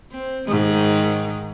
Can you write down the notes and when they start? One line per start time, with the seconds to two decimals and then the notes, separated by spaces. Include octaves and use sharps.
0.12 C4
0.47 G#2 D#3